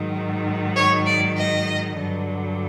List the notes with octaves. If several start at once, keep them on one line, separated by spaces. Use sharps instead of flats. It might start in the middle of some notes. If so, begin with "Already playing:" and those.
Already playing: G#2 D#3 F#3
C#5
D5
D#5
G2 D3 F#3